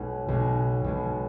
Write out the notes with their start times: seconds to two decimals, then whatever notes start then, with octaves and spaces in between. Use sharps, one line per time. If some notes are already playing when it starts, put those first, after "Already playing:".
Already playing: B1 B2 G#3
0.28 B1 B2 G#3
0.84 B1 B2 G#3